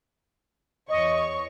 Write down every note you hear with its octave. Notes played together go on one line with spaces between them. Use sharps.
E2 C#5 D#5 C#6